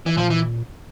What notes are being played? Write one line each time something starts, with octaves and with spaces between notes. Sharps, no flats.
E3
A#2 F3
E3